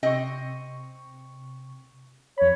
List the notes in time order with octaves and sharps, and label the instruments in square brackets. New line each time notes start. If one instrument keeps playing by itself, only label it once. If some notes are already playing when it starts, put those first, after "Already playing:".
[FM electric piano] C3 C#6 [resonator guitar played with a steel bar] C4 D#5
[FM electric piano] F2 B5 [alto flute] C#5